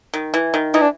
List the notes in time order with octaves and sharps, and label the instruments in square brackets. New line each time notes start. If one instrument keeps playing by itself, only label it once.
[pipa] D#3
E3
D#3
[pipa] E3 [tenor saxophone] D#4
[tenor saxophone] D4